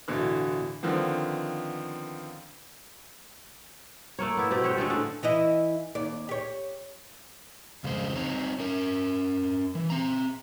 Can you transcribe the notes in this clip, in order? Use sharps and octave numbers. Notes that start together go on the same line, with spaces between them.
D1 B2 D3 E3
D3 D#3 F3 B3 C4
A3 A#3 C#5
B3 E4
B2 A3 C4 G4
F#4 G4 C5 C#5
D3 G#3 A3 A4
A2 D3 F#5
E3 E4 D#5
D#2 D5
G4 C#5
F2 C#3 G#3 C5
C4 D#4 C#5
C#4 A#4
E3
C4 A#5